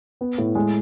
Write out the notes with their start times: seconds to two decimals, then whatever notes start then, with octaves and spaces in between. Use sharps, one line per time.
0.21 B3
0.38 A2
0.55 G#3